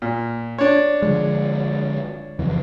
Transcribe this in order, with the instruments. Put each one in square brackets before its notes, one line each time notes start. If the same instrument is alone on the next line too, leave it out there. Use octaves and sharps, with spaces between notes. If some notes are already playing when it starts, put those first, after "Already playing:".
[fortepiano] A#2
D4 C#5
[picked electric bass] D3 F3 G#3
F#1 F2 E3